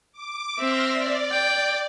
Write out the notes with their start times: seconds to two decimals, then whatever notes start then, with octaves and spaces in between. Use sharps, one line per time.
0.13 D6
0.59 C4 E5 C6 F6 A#6
0.91 D5
1.31 G5